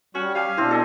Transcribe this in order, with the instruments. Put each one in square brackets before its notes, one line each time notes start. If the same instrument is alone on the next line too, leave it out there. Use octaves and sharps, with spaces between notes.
[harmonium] G3 [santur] C#4 [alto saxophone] F#4
[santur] G4 G#5 [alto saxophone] F5
[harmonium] B2 D4 [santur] C4 G4 C5 [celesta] E4 E5
[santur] A4 D#5 G#5